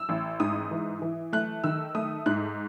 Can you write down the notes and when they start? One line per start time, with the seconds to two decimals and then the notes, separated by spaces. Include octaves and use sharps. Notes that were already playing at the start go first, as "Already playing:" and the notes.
Already playing: E6
0.09 A1
0.40 G#2 D#6
0.71 E3
1.02 E3
1.33 A3 F#6
1.64 D#3 E6
1.95 A3 D#6
2.26 G#2 F#6